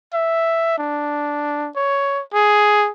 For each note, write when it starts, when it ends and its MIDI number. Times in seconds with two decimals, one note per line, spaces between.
0.13 0.74 76
0.78 1.69 62
1.76 2.22 73
2.34 2.90 68